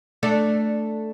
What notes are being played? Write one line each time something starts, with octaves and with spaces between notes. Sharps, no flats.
A3 D4 A4